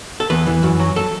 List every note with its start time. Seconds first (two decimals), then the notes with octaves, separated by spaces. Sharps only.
0.20 A4
0.30 E2 B4
0.47 E3
0.63 F#2
0.79 F#3
0.96 A4